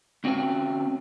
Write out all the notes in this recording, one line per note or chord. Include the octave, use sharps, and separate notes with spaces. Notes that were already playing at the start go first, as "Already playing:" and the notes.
D2 C4 C#4 F#4 G5